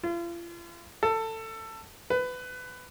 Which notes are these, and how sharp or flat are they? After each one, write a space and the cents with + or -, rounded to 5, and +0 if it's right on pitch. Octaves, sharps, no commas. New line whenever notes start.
F4 -40
A4 +20
B4 +20